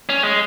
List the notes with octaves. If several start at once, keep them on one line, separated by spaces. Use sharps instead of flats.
C#4
G#3